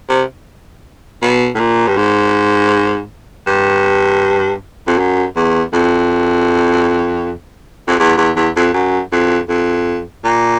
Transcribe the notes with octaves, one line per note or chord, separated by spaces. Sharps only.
C3
B2
A2
A#2
G2
G#2
G2
F2
F#2
E2
F2
F2
E2
E2
E2
F2
F#2
F2
F2
A#2